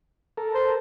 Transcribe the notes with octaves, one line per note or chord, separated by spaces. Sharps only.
A4 A#4
C5